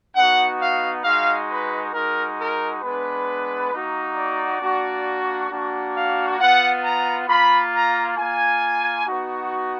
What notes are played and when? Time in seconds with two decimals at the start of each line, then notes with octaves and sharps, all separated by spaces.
0.15 B3 D#4 F#4 F#5
0.60 F5
1.04 G#3 D#4 F#4 F5
1.49 B4
1.93 G#3 D#4 F#4 A#4
2.38 A#4
2.82 G#3 B3 D4 B4
3.73 A#3 D#4 F#4
4.16 D5
4.61 A#3 D4 F#4
5.50 A#3 D4 F#4
5.94 F5
6.39 B3 F4 F#5
6.84 A#5
7.28 A#3 F4 B5
7.73 A#5
8.17 A#3 F4 G#5
9.07 B3 D#4 F#4